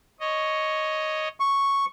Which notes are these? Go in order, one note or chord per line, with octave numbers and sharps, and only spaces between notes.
C#5 D#5
C#6